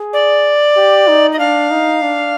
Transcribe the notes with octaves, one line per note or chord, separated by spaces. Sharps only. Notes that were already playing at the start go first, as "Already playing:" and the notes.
Already playing: G#4
D5
G4
D#4
D#5
D4 F5
D#4
D4